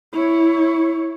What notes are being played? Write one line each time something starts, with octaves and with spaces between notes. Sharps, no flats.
E4 C#5